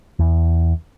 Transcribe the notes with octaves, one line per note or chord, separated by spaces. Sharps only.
E2